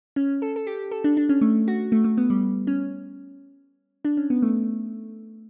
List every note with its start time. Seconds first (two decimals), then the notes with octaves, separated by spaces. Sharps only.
0.16 C#4
0.42 A4
0.56 A4
0.67 G4
0.91 A4
1.04 D4
1.17 D4
1.29 C#4
1.41 A3
1.68 F#4
1.92 A3
2.04 A3
2.18 B3
2.30 G3
2.67 C#4
4.05 D4
4.17 C#4
4.30 B3
4.42 A3